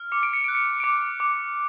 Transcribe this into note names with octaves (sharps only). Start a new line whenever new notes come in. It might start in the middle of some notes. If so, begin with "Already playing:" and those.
Already playing: F6
D6 C#7
D7
C#7
F#6 D7
C#7
D7
D6 C#7
D6